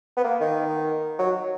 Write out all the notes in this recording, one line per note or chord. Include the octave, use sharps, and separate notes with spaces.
B3
A#3
D#3
F#3